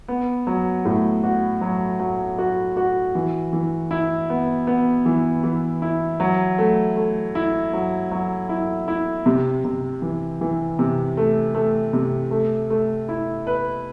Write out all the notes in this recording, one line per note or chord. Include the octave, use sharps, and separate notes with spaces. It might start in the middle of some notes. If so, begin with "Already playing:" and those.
B3
F#3
A2
F#4
F#3
F#3
F#4
F#4
E3
E3
E4
B3
B3
E3
E3
E4
F#3
A3
A3
E4
F#3
F#3
E4
E4
C3
C3
E3
E3
C3
A3
A3
C3
A3
A3
E4
B4